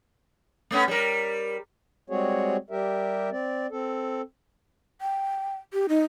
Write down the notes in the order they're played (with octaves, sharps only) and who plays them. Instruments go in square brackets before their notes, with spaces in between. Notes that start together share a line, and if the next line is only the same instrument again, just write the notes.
[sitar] A3 B3 C#4
G3 A#4
[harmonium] G3 G#3 C4 F#4 G#4 C#5
G3 G4 A#4 E5
C4 D5
C4 A4
[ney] G5
G4
D#4